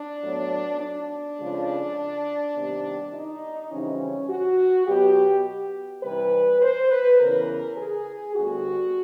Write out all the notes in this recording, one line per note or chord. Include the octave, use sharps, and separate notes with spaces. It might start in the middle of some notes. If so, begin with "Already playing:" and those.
Already playing: D4
A2 F#3 B3
D4
F2 C#3 F3 G#3
C3 D#3 G3 B3
D#4
F2 C#3 E3 G3 C4 C#4
F#4
B2 F#3 B3 G4
C3 E3 G3 B4
C5
B4
E2 C#3 E3 A#4
G#4
D2 D3 G3 B3 F#4